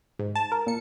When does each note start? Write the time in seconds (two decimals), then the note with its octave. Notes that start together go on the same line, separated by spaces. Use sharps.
0.19 G#2
0.35 A5
0.52 A#4
0.66 A#2 C#7